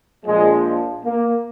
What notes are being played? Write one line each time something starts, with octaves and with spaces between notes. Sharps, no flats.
A#1 A#2 F3 G#3
A#3